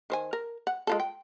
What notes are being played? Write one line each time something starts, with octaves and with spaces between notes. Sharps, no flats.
D#3 C5 G#5
A#4
F#5
G#3 F4 A4
G5